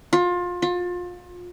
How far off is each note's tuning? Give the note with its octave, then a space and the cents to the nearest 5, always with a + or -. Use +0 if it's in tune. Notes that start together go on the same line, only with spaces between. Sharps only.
F4 +25
F4 +30